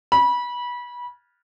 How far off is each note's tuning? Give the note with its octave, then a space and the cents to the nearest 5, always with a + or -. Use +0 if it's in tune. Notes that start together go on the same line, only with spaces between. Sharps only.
B5 -25